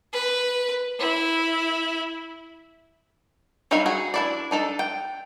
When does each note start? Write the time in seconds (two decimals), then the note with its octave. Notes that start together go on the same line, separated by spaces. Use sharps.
0.13 B4
0.99 E4
3.71 F#3 G3 D#4 E5 F5
3.86 F#4 G#4
4.14 D4 E4 D5
4.51 D4 D#4 A4
4.79 G5